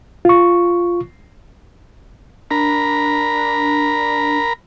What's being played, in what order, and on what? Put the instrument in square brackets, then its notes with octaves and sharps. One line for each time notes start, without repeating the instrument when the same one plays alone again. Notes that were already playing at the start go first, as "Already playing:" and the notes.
[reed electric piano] F4 C#6
[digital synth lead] D4 [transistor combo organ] A#4 A#5 B5